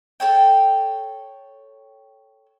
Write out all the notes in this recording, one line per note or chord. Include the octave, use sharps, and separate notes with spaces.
A4 C#5 G5